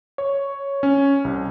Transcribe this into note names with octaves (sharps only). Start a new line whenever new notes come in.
C#5
C#4
C2